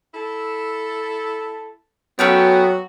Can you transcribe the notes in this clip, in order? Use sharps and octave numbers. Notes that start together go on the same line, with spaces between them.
E4 A4
F#3 A3 B3 C#4 F#4 G5